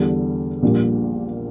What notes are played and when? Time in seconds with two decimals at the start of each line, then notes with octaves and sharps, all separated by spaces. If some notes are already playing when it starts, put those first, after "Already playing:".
Already playing: E2 D3 G3
0.63 A#1 A#2 G3